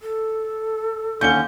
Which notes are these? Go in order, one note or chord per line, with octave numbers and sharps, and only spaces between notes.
A4
D#2 D3 C#4 G6 C#7 G7